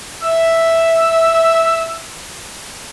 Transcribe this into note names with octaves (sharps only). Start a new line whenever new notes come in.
E5 E6